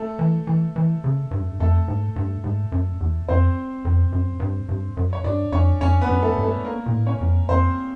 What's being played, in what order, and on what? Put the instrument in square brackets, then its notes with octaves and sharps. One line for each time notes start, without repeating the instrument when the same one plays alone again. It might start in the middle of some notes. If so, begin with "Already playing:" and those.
Already playing: [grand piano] A3 A4
[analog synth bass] E3
E3
E3
C#3
G2
F#2
G2
[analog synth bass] F2 [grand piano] A3 A4
[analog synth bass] G#2
G2
G#2
F#2
E2
[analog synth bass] F2 [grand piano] C4 C5
[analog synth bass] F2
F#2
G2
G2
F#2
[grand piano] C#5
[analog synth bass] G2 [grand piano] D4 D5
[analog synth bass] F2 [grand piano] C#4 C#5
[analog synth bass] F2 [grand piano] C#4 C#5
[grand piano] B3 B4
[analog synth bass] F#2
[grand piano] A3 A4
[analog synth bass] G2
[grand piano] A3 A4
A#3 A#4
[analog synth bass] A#2
A2
[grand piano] C#4 C#5
[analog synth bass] F2
[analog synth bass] F2 [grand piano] C4 C5